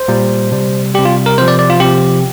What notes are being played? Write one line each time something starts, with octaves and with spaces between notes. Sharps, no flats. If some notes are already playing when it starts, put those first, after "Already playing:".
Already playing: C5
A#2 G3
C3 G3
C3 G3 G4
F4
A#4
C3 F3 C5
D5
D5
F4
C3 F3 G4